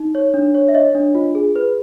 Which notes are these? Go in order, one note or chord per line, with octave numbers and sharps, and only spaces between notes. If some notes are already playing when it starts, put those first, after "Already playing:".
Already playing: D#4
C#5
D4
C#5
E5
C#5 D#5
D4
F4
G#4
B4